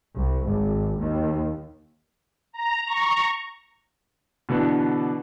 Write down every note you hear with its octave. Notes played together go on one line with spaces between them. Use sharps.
C2
G#1
D#2
A#5
A#5 C#6
B2 D3 E3 B3 D4